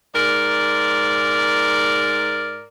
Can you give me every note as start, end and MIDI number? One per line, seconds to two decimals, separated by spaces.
0.15 2.67 44
0.15 2.67 70
0.15 2.67 74